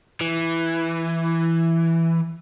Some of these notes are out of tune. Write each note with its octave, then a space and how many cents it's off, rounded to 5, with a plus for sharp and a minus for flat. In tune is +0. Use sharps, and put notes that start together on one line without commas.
E3 +5